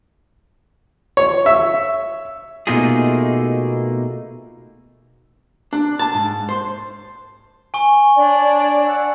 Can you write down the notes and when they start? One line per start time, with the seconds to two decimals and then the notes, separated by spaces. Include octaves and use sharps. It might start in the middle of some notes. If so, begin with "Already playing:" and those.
1.17 C#5
1.46 E5
2.67 B2 A3 A#3 D#4 F4 G#4
5.73 D4
5.99 A5
6.14 G#2
6.49 C5
7.74 G#5 C#6
8.16 D4 C#5 D5
8.85 F#5 E6